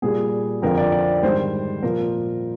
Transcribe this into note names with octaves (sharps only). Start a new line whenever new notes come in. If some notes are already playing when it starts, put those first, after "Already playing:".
A#2 G3 G#4
F2 D3 F3 A#4
D5
D5
G#2 D#3 G3 C5
A#2 F3 A#4